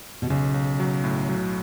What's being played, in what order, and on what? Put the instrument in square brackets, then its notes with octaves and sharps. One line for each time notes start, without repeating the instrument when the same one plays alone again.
[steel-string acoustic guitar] B2
[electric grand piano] B1 [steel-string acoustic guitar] C#3
[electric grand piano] B1
F#3
A2
F#3